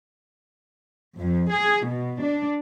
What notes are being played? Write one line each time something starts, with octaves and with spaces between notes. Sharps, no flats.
F2
G#4
B2
D4